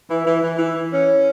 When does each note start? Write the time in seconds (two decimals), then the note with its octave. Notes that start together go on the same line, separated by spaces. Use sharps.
0.09 E3
0.26 E3
0.43 E3
0.59 E3
0.75 E3
0.92 C#4